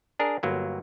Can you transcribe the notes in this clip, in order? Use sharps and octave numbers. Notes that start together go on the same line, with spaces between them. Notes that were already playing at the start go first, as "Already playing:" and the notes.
D4 G#4 A#4
G1 F#3 A#3